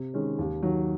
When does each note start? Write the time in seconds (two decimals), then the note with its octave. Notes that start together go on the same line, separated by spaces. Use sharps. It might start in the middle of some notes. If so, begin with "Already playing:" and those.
Already playing: C3
0.14 D#3 G#3 C#4
0.39 D#2
0.63 D#3 F#3